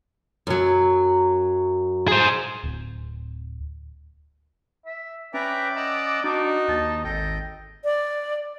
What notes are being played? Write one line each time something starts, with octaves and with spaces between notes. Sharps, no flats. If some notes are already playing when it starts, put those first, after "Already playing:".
F#2 F#3
G#4 C5
D1
E5
C#4 B4 D5 E5 G5 A#5
D#5 F#5 A#5 E6
D4 D#4 F#4
D#2 A5
G#1 A4 D#5 G5
D5